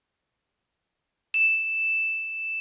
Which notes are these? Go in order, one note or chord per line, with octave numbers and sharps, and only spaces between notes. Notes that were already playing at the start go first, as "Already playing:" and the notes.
E7